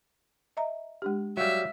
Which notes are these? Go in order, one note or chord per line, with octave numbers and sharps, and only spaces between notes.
D#5 E5 A#5
G#3 D4 G4
F#3 G3 E5 F5